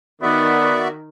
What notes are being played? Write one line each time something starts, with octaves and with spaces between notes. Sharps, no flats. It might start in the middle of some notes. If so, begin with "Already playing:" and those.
D#3 B3 F#4 D5 E5